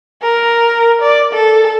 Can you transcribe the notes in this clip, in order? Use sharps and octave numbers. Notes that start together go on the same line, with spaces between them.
A#4
D5
A4